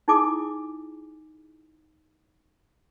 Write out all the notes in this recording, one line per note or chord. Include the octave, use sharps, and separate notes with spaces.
D#4 E4 G#4 G#5 D6 D#6